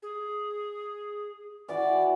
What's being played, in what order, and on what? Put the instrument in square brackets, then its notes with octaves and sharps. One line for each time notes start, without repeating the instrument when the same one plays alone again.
[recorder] G#4
[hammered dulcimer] E3 F#4 [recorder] D5